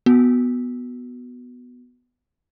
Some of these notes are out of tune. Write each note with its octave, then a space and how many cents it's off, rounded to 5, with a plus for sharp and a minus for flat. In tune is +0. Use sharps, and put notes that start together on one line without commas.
B3 +0 F#4 +0